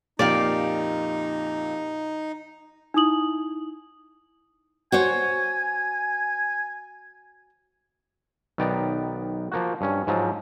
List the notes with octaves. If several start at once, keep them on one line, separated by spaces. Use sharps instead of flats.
F2 A#2 A#3 D#4 G4 D5 F5
D#4 E4 D#6 F#7
F#4 C5 C#5 G#5
B1 D#3 B3 D5 G5 A#5
F3 A#3 F#4
G2 C#4
G#2 F3 F#3